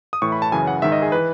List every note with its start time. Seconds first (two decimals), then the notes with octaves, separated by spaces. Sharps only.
0.13 D#6
0.22 A2 E3 C#6
0.32 B5
0.42 A5
0.52 F#2 C#3 E3 G#5
0.67 F#5
0.82 G#2 D#3 E5
0.92 D#5
1.02 G#4
1.12 E3 B4